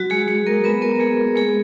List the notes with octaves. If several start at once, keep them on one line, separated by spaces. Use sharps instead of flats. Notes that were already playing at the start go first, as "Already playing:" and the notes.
Already playing: F#3 F#4
G#3 G#4
G#3 G#4
A#3 A#4
B3 B4
A#3 A#4
G#3 G#4
G#3 G#4